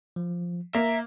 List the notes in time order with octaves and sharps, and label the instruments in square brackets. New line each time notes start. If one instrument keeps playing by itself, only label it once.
[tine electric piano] F3
[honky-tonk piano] A#3 [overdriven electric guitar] E5 [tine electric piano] A#5